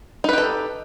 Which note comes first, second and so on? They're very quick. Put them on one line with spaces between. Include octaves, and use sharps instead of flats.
D#4 B4 G4 A4